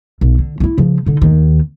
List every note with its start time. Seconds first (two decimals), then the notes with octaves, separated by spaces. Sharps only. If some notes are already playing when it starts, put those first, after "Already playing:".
0.21 B1
0.39 D3
0.60 C#4 E4
0.78 C#3 F3
1.06 D3 D#4
1.22 D#2 D#3